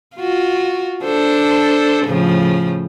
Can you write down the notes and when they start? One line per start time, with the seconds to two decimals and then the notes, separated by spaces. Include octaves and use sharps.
0.16 F4 F#4
1.03 D4 A4 C5
2.05 A2 C#3 F3